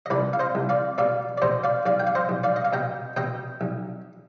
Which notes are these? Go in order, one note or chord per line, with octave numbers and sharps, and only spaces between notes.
D#5
C2 B4 D5
F5
C5 D#5
C2
D5 F5
B2 D5 F5
D5
B2 C5 D#5
D5 F5
B1 D5 F5
G5
F5
C5 D#5
B1
D5 F5
D#5
F5
B2 D#5 G5
B2 D#5 G5
B1